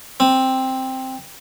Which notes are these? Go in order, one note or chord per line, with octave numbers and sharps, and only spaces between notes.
C4